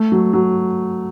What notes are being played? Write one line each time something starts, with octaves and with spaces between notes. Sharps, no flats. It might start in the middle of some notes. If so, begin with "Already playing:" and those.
Already playing: A3
F#3
F#3